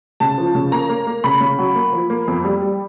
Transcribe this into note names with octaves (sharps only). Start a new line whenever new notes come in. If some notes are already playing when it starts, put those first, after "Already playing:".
C#3 A5
F3
C#3
A#3 A#5
A#3
A#3
C#3 B5
C#3
F#3
A#3
F3
A#3
F2
G3
G3